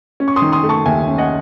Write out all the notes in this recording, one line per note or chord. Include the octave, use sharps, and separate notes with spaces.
C#4
C#6
C6 D#6
D#3
C6 D#6
A3
A5 C#6
D#2 E5 G#5
C#4
D#5 F#5